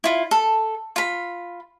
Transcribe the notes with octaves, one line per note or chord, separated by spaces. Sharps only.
E4 F4
A4
F4 B5